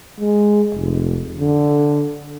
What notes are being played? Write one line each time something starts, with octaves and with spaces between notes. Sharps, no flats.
G#3
F1
D3